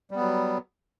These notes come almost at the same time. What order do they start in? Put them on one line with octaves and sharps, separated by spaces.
G3 B3 F#3